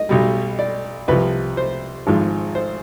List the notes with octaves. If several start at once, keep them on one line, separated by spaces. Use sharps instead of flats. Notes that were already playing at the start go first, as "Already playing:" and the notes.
Already playing: D#5
B1 B2 G3
D5
C2 C3 F3 B4
C5
G#1 G#2 F3
C5